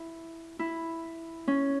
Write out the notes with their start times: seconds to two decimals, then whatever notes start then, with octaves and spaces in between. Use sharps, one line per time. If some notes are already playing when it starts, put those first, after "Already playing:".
Already playing: E4
0.59 E4
1.48 C#4